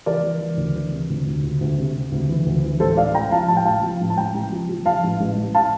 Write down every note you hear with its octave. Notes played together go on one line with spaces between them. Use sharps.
E3 A#4 D5
E3
E3
D2
E3
C3
D2
D2
D2
D2
C3
C3
D2
E3
D2
E3
A1 A4 C5
A1 D5 F5
A1 G5 A#5
F3 F5 A5
A1 A5
G5
A1 F5 A5
F3
A1
A5
A1 G5 A#5
A1
F3
F3
F3 F5 A5
A1
A1
A1
F5 A5